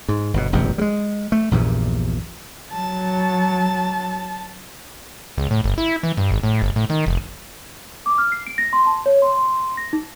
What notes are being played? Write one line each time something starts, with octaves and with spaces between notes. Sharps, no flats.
G#2
G1 B2
E1 A1 F#2 C3
G3 G#3
A3
A#1 E2 G2 A#2
F#3 A5
C#2
A2
G1
E4
E3
G2
G#1
A2
G1
A2
D#3
F1
D6
F6
C7
D7
A#6
C6
A5
C#5
C6
C6
A#6
D#4